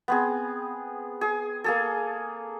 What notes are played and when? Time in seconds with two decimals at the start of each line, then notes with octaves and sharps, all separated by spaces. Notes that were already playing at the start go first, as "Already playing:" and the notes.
0.08 B3 C4 G#4
1.21 G#4
1.64 A#3 G#4 A4